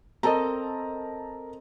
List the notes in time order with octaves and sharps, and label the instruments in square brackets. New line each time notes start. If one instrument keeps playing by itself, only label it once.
[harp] C4 A4 D#5 [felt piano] A#4 A5 A#5